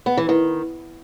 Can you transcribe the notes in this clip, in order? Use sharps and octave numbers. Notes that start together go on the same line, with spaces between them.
B3
E3
D#3